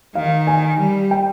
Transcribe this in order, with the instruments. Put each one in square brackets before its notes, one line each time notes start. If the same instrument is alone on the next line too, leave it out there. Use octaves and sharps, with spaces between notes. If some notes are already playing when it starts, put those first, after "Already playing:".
[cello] D#3 [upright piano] F5
[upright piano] G#5
[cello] G3
[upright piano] G5